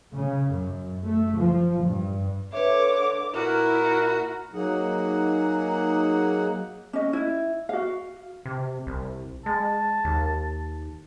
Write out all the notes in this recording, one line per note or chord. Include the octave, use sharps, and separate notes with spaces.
C#3
F#2
A3
F3
G2
D3 B4 C#5 E5 D6
A#2 E4 F#4 A#4
F#3 A#3 D#4 G#4 F#5
C#4 D#5
E4
F#4 F5
C3
C2
G#3 A5
D#2